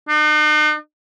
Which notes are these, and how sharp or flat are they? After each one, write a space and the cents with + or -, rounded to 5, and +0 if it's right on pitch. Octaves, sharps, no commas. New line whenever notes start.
D#4 -45